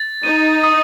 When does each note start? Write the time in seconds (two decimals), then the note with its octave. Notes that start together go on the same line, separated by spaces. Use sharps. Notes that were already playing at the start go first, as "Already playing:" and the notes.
Already playing: A6
0.23 D#4 D#7
0.63 D#6